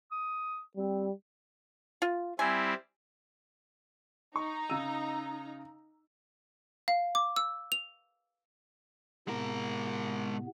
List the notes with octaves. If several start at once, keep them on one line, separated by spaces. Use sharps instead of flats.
D#6
G3 C4
F4
G3 C4 E4 G#5
D#4 A#5 C#6
C#3 E6 D#7
F5
D6
E6
F7
A2 C3 G#3 B3 A#4